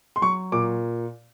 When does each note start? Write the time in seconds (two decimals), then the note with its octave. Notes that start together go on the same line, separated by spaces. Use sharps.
0.16 C6
0.22 F#3 C#6
0.52 A#2 D6